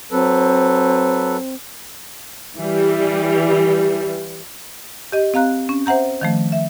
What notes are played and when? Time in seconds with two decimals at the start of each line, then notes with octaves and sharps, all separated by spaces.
0.12 F#3 C4 A4 B4
2.56 E3 G3
5.12 G4 D#5
5.34 C4 F5 A#5 F#6
5.69 C#4
5.86 C5 E5 F#5 A#5 G6
6.21 D#3 F3 A3
6.52 E5